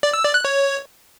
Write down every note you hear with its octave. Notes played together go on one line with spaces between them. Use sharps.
D5
E6
D5
F#6
C#5